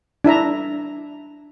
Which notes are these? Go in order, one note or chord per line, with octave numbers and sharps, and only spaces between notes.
D4 E4 E5 A#5